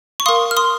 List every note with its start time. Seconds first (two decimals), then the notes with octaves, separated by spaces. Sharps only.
0.20 C#6
0.26 A#4 F5 C6 D#6
0.51 F6
0.57 C6 D#6